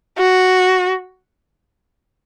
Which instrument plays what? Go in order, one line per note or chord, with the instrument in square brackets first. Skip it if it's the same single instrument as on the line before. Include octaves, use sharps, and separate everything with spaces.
[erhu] F#4